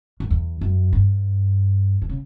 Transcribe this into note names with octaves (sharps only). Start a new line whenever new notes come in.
F#2
E2
F#2
G2
D3
C#3